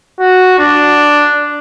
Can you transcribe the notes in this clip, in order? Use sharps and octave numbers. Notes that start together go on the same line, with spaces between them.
F#4
D4